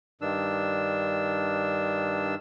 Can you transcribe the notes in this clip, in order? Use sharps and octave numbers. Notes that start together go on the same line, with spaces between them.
G2 D#3 D4 E6